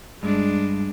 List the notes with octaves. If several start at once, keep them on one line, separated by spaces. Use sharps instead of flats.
G2 G#3 D4